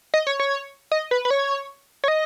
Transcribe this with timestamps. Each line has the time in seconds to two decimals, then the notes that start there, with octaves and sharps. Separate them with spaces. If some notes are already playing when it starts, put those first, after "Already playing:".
0.14 D#5
0.27 C#5
0.40 C#5
0.91 D#5
1.11 B4
1.25 B4
1.30 C#5
2.04 C#5
2.08 D#5